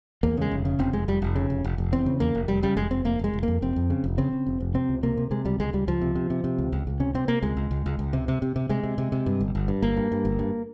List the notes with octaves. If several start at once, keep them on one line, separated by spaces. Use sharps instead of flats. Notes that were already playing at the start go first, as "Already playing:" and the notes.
E2 A#3
C#3 G#3
F1
C#3
F1 C4
F1 G#3
F1 G3
F1
C#3
F1
F1
F1
E2 C4
C#3
E2 A#3
F1
F1 G3
C#3 G3
F1 G#3
F1 C4
F1 A#3
F1 G#3
F1
F2 A#3
F1 C4
F2
C#3
F1
C#3 C4
C#3
F1
F1
C3 C4
C#2
C3 A#3
C3
C3 G#3
C#2 G3
C#2 G#3
C#2 G3
C#2 F3
C3
C3
C3
C3
C#2
C#2
C#2
C3 C#4
C3 C4
C3 A#3
C#2 G#3
C#2
C#2
C#2
C#2
C3
C3
C3
C3
C3 G#3
C3
C3
C3
G2
G1
G1
G2
G1 A#3
G2
G2
G1
G2